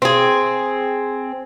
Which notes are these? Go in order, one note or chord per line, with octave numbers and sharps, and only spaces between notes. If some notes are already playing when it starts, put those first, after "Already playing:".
C4 G#4